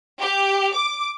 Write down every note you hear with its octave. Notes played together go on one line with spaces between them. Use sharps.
G4
D6